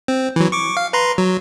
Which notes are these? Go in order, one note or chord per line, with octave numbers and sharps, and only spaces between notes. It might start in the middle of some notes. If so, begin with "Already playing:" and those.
C4
E3 F#3
C#6 D6
F5
B4 A#5 C6
F#3